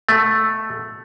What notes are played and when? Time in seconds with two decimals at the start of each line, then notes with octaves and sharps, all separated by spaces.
0.09 B2 A3